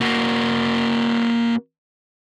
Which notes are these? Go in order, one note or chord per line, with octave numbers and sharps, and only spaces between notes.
A#3 F#4